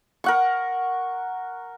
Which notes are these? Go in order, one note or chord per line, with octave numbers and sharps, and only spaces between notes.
A#4 F#5 C#6